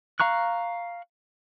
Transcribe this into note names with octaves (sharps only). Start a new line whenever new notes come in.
F5 A#5 C#6 F#6